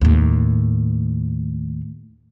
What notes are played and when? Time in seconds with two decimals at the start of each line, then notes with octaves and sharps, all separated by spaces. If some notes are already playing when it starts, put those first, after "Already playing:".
0.01 D#2 A2